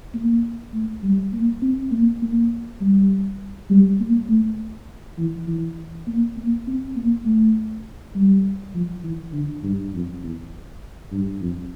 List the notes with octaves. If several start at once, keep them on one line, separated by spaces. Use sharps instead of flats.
A#3
A3
G3
A#3
C4
A#3
A#3
G3
G3
A#3
A3
E3
E3
A#3
A#3
C4
A#3
A3
G3
F3
E3
D3
G2
F2
E2
G2
F2